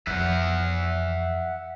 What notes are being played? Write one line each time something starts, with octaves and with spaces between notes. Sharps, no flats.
F2 E5 F#5